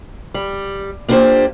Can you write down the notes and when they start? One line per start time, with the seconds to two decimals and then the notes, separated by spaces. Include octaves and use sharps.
0.34 G3
1.08 A#3 B3 D4 F4 G4 C5